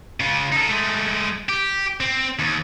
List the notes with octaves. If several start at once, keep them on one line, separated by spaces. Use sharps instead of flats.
C#3 F4
D#4 A4
G#3 A3
G4
C4
D#2